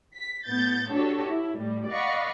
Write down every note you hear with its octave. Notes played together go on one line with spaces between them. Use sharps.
B6
A2 B3 G6 A6
D4 F#4 G4 A4 C#5
E4
A2 G3
D5 D#5 F5 F#5 B5 C#6